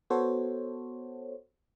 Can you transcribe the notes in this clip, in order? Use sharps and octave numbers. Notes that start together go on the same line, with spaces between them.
B3 F#4 A4 C5 C#5